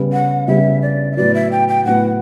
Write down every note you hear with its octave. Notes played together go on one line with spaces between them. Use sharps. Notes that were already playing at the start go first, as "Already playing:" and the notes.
Already playing: C#3 G3 B3
F#5
C#3 G3 B3 E5
D5
E5
A2 F#3 B3 D5
E5
G5
G5
A2 F#3 B3 F#5